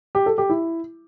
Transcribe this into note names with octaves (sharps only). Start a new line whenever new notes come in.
G4
A4
G4
E4